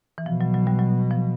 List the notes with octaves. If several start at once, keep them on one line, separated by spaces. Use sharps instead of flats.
E3
B2 F3
F#3
F#3
G3
F#3
F3